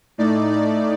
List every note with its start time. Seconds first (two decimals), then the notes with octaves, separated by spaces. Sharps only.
0.18 A2 A3 D#4 D5
0.51 D5